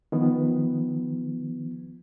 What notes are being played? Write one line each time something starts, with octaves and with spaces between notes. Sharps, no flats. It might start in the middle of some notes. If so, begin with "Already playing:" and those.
D#3 F3 B3